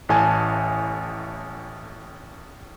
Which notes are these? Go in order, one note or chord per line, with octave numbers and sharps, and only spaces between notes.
A1 A2 G#5 A5